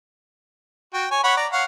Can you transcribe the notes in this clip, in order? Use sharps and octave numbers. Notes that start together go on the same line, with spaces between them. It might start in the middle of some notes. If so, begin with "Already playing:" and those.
F#4 G5
C#5 G#5
C#5 F#5 B5
D5 A#5
C#5 F5 F#5